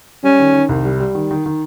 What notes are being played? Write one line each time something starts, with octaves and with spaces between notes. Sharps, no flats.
G3 C#4
D#3
D#3
C2
G3
G3
D#3
D#3
D#3